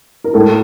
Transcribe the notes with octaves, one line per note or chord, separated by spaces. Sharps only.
A#4
A2 A4